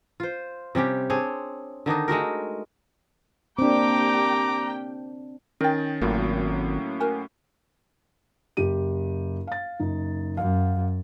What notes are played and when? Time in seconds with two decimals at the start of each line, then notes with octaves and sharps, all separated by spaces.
0.20 F4 C5
0.75 C3 G3 C#4 G4
1.10 C4 D4 G#4 C#5
1.86 D3 D#3 D4 D#4
2.08 G#3 A3 F#4 A#4
3.59 A#3 C4 D4 G4 G5 A#5 D6
5.61 D#3 C#4 A#4 G5 A6
6.01 G#1 A2 F#3 A#3 F4
7.00 F#4 A#4 G#5
8.57 F#1 G4 D#7
9.47 F5 A6
9.79 F#1 D#4
10.37 F#2 F5